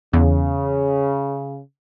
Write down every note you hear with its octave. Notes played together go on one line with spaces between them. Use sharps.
E2 C#3